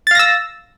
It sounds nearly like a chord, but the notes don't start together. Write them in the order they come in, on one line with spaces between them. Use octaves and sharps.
A6 F5 A#6 E6